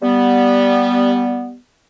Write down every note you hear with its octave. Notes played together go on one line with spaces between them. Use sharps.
G3 B3